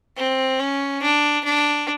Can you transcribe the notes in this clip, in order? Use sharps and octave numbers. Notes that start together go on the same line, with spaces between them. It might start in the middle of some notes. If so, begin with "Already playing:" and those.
C4
C#4
D4
D4